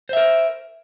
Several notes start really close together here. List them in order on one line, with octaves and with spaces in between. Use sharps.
C5 E5 A#4